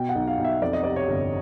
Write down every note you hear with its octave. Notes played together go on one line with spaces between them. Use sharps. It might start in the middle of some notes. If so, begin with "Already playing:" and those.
Already playing: B2 G5
F#5
B1
F5
B1
E5
F2 D5
D#5
C3 D5
C#5
G1